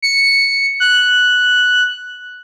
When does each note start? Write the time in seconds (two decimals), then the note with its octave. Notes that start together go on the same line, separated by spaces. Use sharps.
0.02 C#7
0.80 F#6